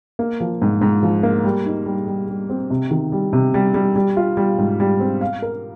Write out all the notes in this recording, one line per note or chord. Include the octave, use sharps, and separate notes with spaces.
A#3
F3
G#2
G#2
F3
A#3
G3
D#4
G3
G3
G3
C4
C3
D#3
G3
C3
G3
G3
G3
F4
G3
G#2
G3
C4
F5
A#4